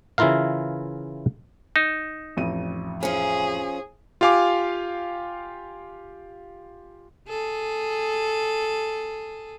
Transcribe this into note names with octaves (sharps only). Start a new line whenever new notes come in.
C#3 E3 E4 F4 A#4 F5
D#4 E7
A1 F2 D#7
F3 C#4 G#4
F4 G4 F5 G#5 D6
G#4 A4